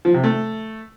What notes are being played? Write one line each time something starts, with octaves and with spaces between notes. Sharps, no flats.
F3
C3
A3